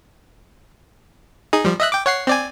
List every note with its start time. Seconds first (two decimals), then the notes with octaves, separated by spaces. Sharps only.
1.53 D#4 G#4
1.65 F3 G3
1.80 D#5 E5 F#6
1.92 G5 D6
2.06 C#5 F#5 C7
2.27 C4 D5 G#5